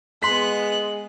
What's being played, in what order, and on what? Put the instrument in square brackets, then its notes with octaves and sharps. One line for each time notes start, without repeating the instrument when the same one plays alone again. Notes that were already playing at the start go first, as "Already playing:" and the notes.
[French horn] G#3 [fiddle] B3 F#6 [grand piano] C6 B6